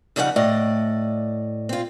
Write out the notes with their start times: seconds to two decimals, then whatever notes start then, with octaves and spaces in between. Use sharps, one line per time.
0.16 F2 C#3 G3 D#4 A4 F#5
0.36 A2 D5 D#5
1.69 C4 F4